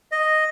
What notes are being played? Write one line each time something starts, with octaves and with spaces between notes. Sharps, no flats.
D#5